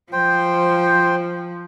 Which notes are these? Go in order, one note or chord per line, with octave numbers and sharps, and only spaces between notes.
F3 C5 G5